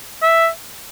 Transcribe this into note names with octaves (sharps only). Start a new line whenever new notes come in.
E5